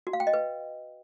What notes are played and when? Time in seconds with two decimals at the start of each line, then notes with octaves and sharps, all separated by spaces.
0.07 F#4
0.13 F5
0.20 G5
0.27 D#5
0.33 B4